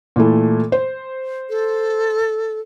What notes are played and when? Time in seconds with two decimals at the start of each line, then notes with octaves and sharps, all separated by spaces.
0.16 A#2 E3 A3
0.72 C5
1.49 A4